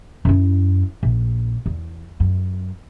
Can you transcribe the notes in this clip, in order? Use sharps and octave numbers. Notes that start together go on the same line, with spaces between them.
F#2 E4
A#1
E2
F#2